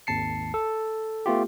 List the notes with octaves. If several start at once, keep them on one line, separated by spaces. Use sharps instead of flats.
G#1 D#2 A5 C7 C#7
A4
A3 B3 F4 G4